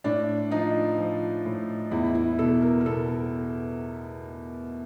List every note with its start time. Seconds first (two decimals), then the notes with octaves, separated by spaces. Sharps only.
0.04 A2 D4
0.51 F3 D#4
0.98 F3
1.46 A2
1.91 E2 E4
2.15 E4
2.39 B2 A4
2.62 A#4
2.81 A#4
2.85 B2 A4